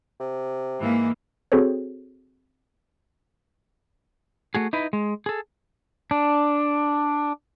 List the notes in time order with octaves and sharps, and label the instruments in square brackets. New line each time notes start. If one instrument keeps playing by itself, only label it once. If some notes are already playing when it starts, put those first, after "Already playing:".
[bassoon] C3
[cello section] G#2 E3 A#3
[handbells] C4 F#4 G#4 A4 C5 C#5
[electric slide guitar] A3 F#4 G#4
D#4 E4 B4
G#3
G#4 A4
[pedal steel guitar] D4